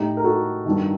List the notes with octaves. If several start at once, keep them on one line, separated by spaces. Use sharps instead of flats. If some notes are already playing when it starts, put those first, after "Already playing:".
Already playing: A2 D#4 G4
A#4
F#4 A4
G2 D#3